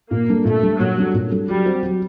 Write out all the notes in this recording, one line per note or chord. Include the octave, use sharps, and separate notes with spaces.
A#2 A#3
G3 D4 A4
A#2 A3
G3 D4 A4
A#2 F#3
G3 D4 A4
A#2
G3 D4 A4
F#3 G3
C4 F#4 C5
F#3